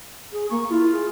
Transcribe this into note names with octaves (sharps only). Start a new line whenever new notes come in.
G#4
A#3 C#6
E4 F4
G#4